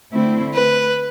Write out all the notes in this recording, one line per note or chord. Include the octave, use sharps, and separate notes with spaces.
D3 A3 C4 E4
B4